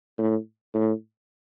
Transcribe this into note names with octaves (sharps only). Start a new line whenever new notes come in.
A2
A2